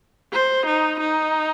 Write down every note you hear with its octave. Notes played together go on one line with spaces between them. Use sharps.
C5
D#4
D#4